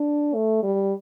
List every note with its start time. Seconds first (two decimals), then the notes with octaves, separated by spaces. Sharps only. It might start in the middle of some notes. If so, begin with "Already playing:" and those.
Already playing: D4
0.35 A3
0.63 G3